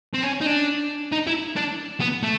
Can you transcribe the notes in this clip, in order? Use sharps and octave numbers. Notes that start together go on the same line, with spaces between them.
C4
C#4
D#4
D4
D#4
E4
D4
B3
A3